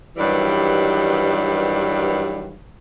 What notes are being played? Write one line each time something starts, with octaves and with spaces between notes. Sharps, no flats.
G2 D#3 E3 F#3 G3